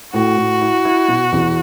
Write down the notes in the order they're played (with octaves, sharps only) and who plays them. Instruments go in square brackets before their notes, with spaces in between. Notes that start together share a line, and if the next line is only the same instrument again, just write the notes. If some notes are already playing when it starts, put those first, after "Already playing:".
[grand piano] A2 [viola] F#4
[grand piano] A2
E4
E4
B2
E2